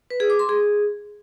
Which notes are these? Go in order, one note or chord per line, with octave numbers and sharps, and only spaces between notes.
B4
G#4
D6
C6
G#4